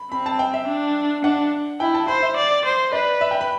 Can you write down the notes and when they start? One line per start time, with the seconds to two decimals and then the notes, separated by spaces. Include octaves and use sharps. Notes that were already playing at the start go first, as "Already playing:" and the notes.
Already playing: B5
0.12 C4 B5
0.26 A5
0.39 G5
0.54 E5
0.68 D4
1.24 D4 F#5
1.80 E4 G5
1.94 A5
2.08 C5 B5
2.23 E5
2.37 D5
2.65 C5
2.93 B4 D5
3.21 E5
3.31 G5
3.41 B5